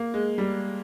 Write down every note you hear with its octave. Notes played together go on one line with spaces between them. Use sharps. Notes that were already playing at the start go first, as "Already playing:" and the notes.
Already playing: A#3
G#3
G3